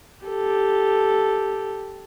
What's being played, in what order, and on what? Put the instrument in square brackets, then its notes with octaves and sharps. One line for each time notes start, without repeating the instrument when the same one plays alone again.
[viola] G4 A4